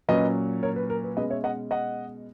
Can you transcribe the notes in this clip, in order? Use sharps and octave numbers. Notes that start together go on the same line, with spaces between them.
A#2 F#3 C#4 B4 D#5
A#4 C#5
B4
A#4
B4
B2 G#3 C#4 B4 D#5
C#5 E5
D#5 F#5
D#5 F#5